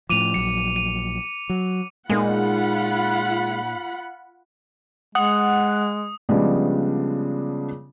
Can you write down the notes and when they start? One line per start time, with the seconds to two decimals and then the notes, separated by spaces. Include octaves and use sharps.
0.10 A2 F3 D6 D#7 F7
0.34 A#1 F#3 C#7
0.76 D#7
1.50 F#3
2.10 A#2 G#3 A#3 D#4 F4 F#5 B5
5.15 G#3 F#5 D#6 F#6
6.29 C#3 F3 G3 G#3 B3 D4